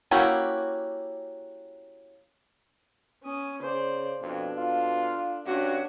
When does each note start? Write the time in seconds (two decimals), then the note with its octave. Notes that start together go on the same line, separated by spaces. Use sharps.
0.11 A#3 C#4 E4 F#4 G4
3.23 C#4 D#6
3.62 C#3 C5 D5
4.22 F2 B2 D4 A4
4.58 F4
5.47 G2 C#4 D4 F#4